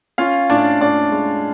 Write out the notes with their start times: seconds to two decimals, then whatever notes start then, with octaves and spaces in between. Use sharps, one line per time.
0.18 C#4 F4 F5
0.50 A2 D4 D5
0.80 A2 D4 D5
1.12 G#3